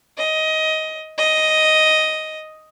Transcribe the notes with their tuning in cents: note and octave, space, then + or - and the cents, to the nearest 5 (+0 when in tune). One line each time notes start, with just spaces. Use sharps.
D#5 +15
D#5 +5